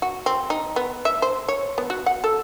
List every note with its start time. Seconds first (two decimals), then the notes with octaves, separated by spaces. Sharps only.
0.02 F#4
0.26 C4
0.50 D#4
0.76 B3
1.05 E5
1.22 C5
1.48 C#5
1.78 B3
1.90 F#4
2.06 F#5
2.24 A4